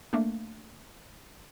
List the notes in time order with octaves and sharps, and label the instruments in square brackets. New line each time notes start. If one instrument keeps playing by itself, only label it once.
[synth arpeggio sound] A3 A#3 D4